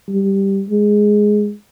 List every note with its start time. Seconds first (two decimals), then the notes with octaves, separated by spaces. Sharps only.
0.08 G3
0.69 G#3